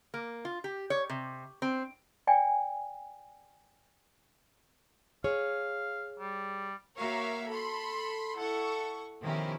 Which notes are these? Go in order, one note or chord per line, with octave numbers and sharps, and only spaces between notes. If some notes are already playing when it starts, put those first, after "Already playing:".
A#3
F4
G4
C#5
C3
C4
D5 G5 G#5
G#4 C#5 F5
G3
A#3 F#4 A#4 C#5 E5 F5
A4 B5 C6
E4 A4 F#5 C#6
B2 D#3 F3 C#4 E4 G4